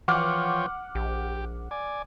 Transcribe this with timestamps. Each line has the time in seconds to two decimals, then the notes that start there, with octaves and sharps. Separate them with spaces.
0.08 E3 F3 C#5 F#5 G5 D6 F6
0.95 A#1 G4
1.71 D5 G#5